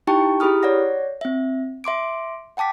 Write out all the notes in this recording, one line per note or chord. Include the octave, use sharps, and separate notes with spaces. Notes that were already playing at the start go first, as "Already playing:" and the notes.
D#4 E4 G4 G5 A5 C#6
E4 G4 G#4 B5 D#6 F6
C#5 D5 F#5 A#6
C4 E5
E5 C6 D6 D7
F#5 G5 A5 D6 B6